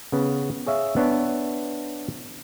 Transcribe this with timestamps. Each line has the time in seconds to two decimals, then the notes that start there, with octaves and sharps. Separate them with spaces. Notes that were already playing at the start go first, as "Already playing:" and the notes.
0.12 C#3 B3
0.66 G#4 C#5 E5 F5
0.97 B3 D4 C#5 E5